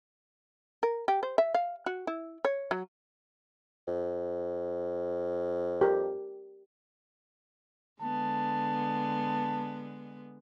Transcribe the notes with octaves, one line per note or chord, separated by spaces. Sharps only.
A#4
G4
C5
E5
F5
F#4
E4
C#5
F#3
F2
G4 A#4
D3 G#3 B3 A5